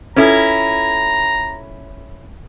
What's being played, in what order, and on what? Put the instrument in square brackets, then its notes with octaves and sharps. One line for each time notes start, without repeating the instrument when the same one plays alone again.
[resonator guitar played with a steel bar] C#4 E4 [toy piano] F4 A4 B4 [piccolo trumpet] A#5